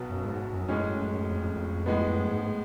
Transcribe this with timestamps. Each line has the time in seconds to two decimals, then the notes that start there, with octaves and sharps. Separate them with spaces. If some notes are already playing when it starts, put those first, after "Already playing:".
Already playing: B1 B2 F#3 B3
0.10 F#2
0.25 G#2
0.53 F#2
0.68 F#2 A2 G#3 C#4
0.98 F#2
1.28 F2
1.42 F2
1.56 F2
1.86 A2 G#3 B3
2.07 F2
2.15 F#2
2.30 G#2